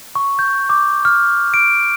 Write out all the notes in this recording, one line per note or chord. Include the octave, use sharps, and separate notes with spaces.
C#6
G6
D6
F6
D7